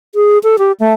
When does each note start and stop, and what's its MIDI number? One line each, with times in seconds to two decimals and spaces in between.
0.15 0.38 68
0.43 0.56 69
0.59 0.72 67
0.80 0.94 57